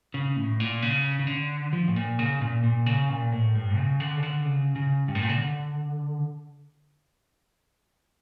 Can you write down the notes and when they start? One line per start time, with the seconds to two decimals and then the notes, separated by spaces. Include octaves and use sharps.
0.14 C#3
0.36 A2
0.60 A#2
0.82 C#3
1.19 C#3
1.27 D3
1.73 F3
1.88 A2
1.96 A#2
2.19 C#3
2.41 A#2
2.64 A#2
2.86 C#3
3.10 A#2
3.32 A2
3.55 G2
3.77 C#3
4.00 D3
4.17 C#3
4.23 D3
4.45 C#3
4.76 C#3
5.08 G2
5.15 A2
5.22 A#2
5.29 C#3
5.36 D3